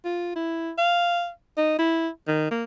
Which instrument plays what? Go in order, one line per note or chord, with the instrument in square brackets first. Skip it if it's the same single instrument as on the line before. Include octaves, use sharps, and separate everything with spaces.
[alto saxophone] F4
E4
F5
D#4
E4
D#3
A#3